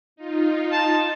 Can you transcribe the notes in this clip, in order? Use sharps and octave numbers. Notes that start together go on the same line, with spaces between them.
D#4 F4
A5